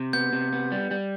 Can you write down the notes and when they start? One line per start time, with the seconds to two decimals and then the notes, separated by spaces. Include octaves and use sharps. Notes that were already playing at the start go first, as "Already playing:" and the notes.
Already playing: C3
0.13 B3 G6
0.33 C3
0.52 B3
0.72 G3
0.91 G3